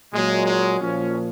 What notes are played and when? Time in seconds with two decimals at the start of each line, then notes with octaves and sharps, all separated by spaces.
0.13 A#2 F#3 G#3
0.46 G#3
0.80 A#2 F3 C#4